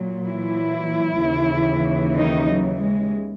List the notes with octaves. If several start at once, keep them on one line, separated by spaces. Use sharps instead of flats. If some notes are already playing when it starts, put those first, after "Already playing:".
Already playing: A#2 F#3
E3 E4
D#2 C#3 E3
D#3 D#4
F#3
G#3